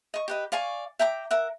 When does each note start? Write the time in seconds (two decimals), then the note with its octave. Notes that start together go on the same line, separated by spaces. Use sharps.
0.14 D#5 C#6
0.28 G4 B4 D#5
0.52 D5 F5 G#5 C#6
0.99 E5 G5 A#5 D6
1.31 A#4 E5 F#5